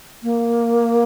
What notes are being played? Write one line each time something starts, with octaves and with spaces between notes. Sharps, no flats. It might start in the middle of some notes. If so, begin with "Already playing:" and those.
A#3